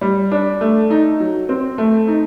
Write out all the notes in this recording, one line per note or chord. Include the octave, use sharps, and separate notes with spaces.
G3
D4
A3
D#4
F#3
C4
A3
D#4